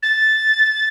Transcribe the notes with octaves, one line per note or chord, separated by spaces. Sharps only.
A6